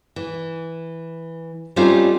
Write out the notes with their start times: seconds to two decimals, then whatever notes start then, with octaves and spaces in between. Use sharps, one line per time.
0.16 E3
1.76 G3 A3 C4 C#4 D#4 F4